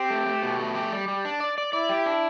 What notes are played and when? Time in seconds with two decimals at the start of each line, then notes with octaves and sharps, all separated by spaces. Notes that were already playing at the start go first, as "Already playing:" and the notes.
Already playing: C4 G4
0.10 A3
0.26 A3
0.43 B2
0.59 A3
0.75 G4
0.93 G3
1.08 G3
1.25 D4
1.40 D5
1.58 D5
1.73 E4 D5
1.89 G4
2.06 D4